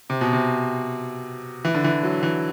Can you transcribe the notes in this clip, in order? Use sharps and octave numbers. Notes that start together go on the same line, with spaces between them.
C3
B2
C3
E3
D3
E3
F#3
E3